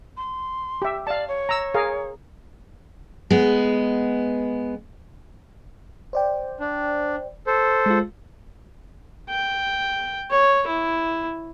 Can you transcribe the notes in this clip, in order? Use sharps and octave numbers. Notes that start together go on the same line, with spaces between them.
C6
G4 E5
D5 F5 A5
C#5
A#5 E6
G#4 A#4 F5
G#3 B3
C5 D5 G5
D4
A4 C5
G#3 F4
G5
C#5
E4